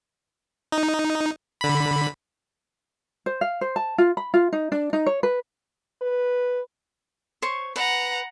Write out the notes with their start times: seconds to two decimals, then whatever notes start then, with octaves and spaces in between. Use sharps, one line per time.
0.72 D#4
1.61 D3 B5
3.26 C5
3.41 F5
3.61 C5
3.76 A5
3.98 F4
4.17 B5
4.34 F4
4.53 D#4
4.72 D4
4.93 D#4
5.06 C#5
5.23 B4
6.02 B4
7.42 C5 C#5 C#6
7.76 B4 F#5 A#5